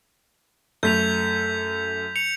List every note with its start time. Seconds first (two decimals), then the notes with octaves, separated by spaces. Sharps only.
0.83 F#2 A3 G6 B6 F7
2.16 C#7 F7